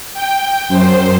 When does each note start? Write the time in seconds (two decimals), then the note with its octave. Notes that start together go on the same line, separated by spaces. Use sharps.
0.14 G5
0.68 F#2 C5